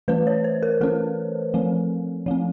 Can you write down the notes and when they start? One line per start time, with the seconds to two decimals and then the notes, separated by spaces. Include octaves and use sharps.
0.08 E3 A3 C#4 B4
0.27 C#5
0.44 C5
0.63 A#4
0.81 E3 A3 C#4 A4
1.54 F3 A3 C4
2.26 F3 A3 C4